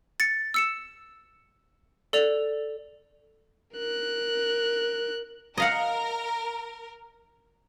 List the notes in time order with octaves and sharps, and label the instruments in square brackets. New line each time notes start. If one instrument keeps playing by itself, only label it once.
[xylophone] A6 C#7
E6 C#7 E7
A4 D5 F7
[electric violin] A#4 F#6
[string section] A#4 [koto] D#5 F5 F#5